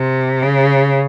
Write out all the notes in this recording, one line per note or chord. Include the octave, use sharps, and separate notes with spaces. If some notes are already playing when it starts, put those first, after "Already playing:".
Already playing: C3
C#3